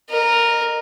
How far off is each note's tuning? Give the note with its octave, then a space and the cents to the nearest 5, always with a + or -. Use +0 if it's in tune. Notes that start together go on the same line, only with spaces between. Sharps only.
A#4 +0 D#5 -30